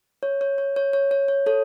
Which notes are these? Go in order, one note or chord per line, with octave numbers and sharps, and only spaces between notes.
C#5
C#5
C#5
C#5
C#5
C#5
C#5
A4 C#5